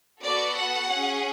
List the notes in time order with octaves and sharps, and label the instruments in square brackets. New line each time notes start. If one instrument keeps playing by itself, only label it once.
[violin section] B3 F#4 A4 D5
F#5
C#4 G#4